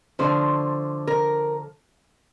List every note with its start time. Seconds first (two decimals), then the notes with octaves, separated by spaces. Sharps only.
0.19 D3 F3 A3 C5
1.07 A#4